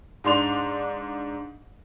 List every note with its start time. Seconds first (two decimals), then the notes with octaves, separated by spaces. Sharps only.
0.24 G#2 D4 C6 F7